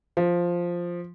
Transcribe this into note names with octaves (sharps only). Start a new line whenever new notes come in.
F3